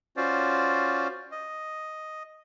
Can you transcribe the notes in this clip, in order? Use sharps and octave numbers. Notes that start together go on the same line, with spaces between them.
C#4 F4 F#4 C5 D5
D#5